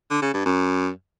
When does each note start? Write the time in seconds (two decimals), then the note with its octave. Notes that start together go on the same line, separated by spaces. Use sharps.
0.10 D3
0.22 C#3
0.34 G2
0.45 F#2